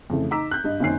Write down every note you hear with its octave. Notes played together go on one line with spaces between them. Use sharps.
F2 C#3 E3 A3
D#4 A#5 D6 E6 B6
F#6 G6
G2 D#5
F#1 F#2 D#3 C4 G#5 C7